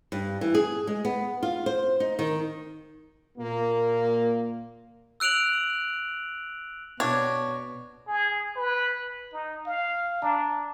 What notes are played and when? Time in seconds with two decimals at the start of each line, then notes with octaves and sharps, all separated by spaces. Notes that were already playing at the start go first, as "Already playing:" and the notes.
0.12 G2
0.41 E3
0.55 G#4
0.87 G#3
1.05 B3
1.43 F4
1.66 C5
2.00 D#4
2.19 D#3
3.38 A#2 A#3
5.20 E6 F#6 D7 F7 F#7
7.00 B2 D4 C#5
8.08 G#4
8.56 B4
9.33 D#4
9.66 F5
10.22 D4 A5 A#5